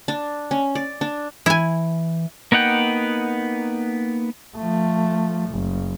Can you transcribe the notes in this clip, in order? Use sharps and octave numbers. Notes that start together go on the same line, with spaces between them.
D4
C#4
D5
D4
E3 E4 G#5
A#3 B3 D#4 F#5 G5
F3 A3
F#1